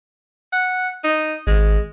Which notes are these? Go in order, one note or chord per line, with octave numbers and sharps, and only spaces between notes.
F#5
D#4
G#1 G#3